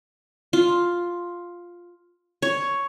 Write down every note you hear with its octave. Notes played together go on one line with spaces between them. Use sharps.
F4
C#5